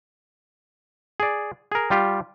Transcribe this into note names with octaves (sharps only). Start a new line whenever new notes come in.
G#4 D5
G#4 A#4
G3 F4 G4